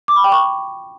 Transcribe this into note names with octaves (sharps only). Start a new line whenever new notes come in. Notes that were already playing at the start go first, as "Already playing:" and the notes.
D6
B5
G5
C#6